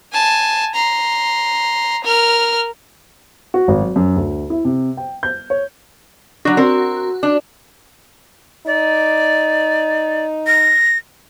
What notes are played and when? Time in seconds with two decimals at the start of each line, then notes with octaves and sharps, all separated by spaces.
0.12 G#5 A5
0.75 A#5 C6
2.04 A#4 F6
3.54 F#4
3.68 G#1
3.81 F#3
3.96 F#2
4.16 D2
4.50 E4
4.65 C3
4.97 G5
5.23 G6
5.50 C#5
6.45 F#3 D4 F#4
6.57 C4 A#4
7.23 D4
8.66 D#4 D5
10.47 A#6